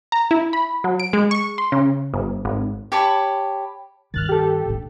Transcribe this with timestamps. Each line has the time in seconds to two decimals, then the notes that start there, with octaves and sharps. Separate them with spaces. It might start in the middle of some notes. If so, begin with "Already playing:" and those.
0.12 A#5
0.31 E4
0.53 B5
0.84 F#3
1.00 D7
1.13 G#3
1.31 C#6
1.58 C6
1.72 C#3
2.14 G1
2.45 G#1
2.92 G4 C#5 A5 B5
4.14 G2 D#3 F6 F#6 A6
4.29 G4 A4
4.66 A2 D4